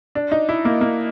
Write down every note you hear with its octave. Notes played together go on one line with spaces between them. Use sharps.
D4
D#4
E4
A#3
A#3